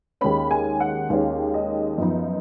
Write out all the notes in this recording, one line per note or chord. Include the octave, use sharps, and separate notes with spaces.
D#2 D#3 G#3 C#4 B5
G#5
F#5
D#2 D#3 G#3 C#4 F5
D#5
F#2 F3 B3 D#4